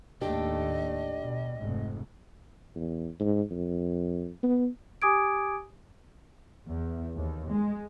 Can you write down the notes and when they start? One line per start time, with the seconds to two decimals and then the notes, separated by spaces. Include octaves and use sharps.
0.21 D#2 A2 A3 D4 G4 D#5
1.20 B2
1.56 F1 G#2
2.75 E2
3.20 G#2
3.51 F2
4.43 B3
5.02 G4 G#5 D6 D#6 G#6 D7
6.67 E2
7.15 D#2
7.49 G#3